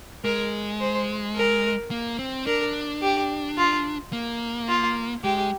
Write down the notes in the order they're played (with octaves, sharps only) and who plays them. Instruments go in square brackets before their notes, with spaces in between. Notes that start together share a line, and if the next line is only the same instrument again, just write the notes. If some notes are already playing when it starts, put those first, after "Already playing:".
[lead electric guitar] G#3 [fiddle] A#4
[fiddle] C5
A#4
[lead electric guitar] A#3
C4
[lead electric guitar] D4 [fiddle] A#4
[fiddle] G4
F4
[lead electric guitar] A#3
[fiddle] F4
[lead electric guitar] G#3 [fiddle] G4